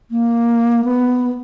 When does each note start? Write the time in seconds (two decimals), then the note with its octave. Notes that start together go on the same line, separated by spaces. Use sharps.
0.11 A#3
0.84 B3